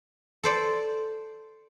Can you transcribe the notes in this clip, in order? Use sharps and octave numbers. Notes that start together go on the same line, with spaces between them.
A4 C5 D5